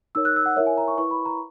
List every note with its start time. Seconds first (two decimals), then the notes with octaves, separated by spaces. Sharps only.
0.15 D#4 A#4 C#5 E6
0.25 F#6
0.36 E6
0.46 F#5
0.57 E4 A#4 C#5 E5
0.66 G#5
0.78 A#5
0.88 C#6
0.98 E4 B4 C#6
1.11 B5
1.26 A#5